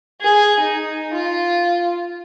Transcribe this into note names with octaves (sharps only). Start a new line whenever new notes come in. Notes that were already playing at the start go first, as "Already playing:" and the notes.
G#4
D#4
F4